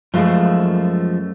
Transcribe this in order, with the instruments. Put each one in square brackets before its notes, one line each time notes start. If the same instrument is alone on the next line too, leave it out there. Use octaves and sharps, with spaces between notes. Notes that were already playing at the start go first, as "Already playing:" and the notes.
[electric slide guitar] F#2 A3 F5 [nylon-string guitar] F3 G#3